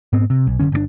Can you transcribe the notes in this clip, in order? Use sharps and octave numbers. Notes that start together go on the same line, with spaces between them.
G#2 B3 C4
C3
B1
F#1 F#2 D3 C#4
G1 C#3 D4